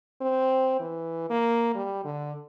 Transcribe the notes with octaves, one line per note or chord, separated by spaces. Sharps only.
C4
E3
A#3
G3
D3